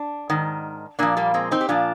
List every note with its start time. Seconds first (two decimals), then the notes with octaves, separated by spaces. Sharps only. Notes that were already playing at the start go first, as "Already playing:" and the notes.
Already playing: D4
0.30 G#2 D#3
0.99 A#2 F3 A#3 D4
1.17 G3 A#3
1.34 G#3 C4
1.51 C4 D#4
1.61 G4
1.69 A#2 F3 D4 F4